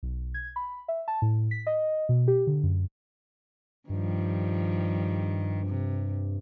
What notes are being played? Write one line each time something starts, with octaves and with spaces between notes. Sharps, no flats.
B1
G#6
B5
E5
A5
A2
B6
D#5
B2
G4
D3
F#2
G2 D#3 F3 G3
C3